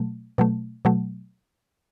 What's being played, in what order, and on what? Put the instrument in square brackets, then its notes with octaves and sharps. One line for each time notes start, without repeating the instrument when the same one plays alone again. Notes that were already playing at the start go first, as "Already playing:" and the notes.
Already playing: [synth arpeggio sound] B2 F#3 A3
B2 F#3 A3
B2 F#3 A3